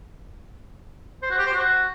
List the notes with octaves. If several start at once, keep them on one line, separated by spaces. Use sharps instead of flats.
C5
F#4
G4
C5
F#4